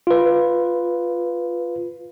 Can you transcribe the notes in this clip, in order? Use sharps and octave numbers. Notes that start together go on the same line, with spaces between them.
F4 B4